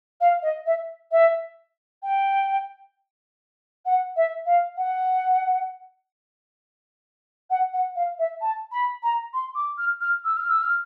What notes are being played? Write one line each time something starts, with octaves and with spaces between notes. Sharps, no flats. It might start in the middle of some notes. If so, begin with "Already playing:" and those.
F5
D#5
E5
E5
G5
F#5
E5
F5
F#5
F#5
F#5
F5
E5
A5
B5
A#5
C6
D6
F6
F6
E6
F6
E6
F6